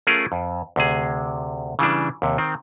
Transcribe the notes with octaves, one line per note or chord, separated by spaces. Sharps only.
A3 C#4 F4 G#4 A#4
F2
D2 C3 G#4
C#3 E3 G3 D4
D#2 C3
D#3 C4